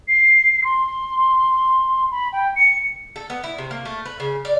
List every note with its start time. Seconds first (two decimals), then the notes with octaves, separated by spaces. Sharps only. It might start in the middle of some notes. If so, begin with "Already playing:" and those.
0.08 C7
0.64 C6
2.11 B5
2.33 G5
2.56 C#7
3.16 A4
3.30 B3
3.44 E4
3.58 C3
3.71 A#3
3.85 A3
4.06 B4
4.20 C#3
4.45 D5